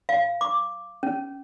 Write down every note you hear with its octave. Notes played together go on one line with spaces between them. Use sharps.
F5
D6
C#4